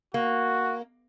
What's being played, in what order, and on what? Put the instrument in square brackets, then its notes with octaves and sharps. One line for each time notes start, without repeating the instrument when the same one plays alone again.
[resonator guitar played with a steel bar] A#3 [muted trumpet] F#4